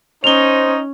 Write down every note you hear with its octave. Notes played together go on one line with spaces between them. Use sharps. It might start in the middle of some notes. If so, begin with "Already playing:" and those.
C#4 D#4 C5 F7 G7